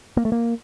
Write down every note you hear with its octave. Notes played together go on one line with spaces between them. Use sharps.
A#3
A3
A#3